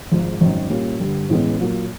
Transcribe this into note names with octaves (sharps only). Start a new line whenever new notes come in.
G#1 G#2 F3
G#1 F#2 D#3
A#2 G3 A#3 C#4
G2 D3 G3
A1 A2 E3 G#3 B3
A#2 F#3 A#3